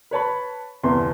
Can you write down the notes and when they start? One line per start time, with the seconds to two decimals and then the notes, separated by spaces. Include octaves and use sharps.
0.11 B4 C#5 A5 B5
0.83 G1 E2 C3 C6